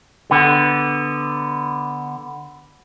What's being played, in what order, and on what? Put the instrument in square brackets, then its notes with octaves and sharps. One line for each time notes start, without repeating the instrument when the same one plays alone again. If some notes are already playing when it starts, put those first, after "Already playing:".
[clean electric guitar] D3 B3